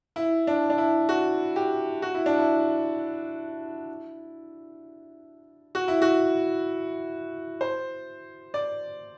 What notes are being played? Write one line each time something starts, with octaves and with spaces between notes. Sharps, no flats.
E4
D4
D4
E4
F#4
G4
F#4
E4
D4
E4
F#4
E4
F#4
C5
D5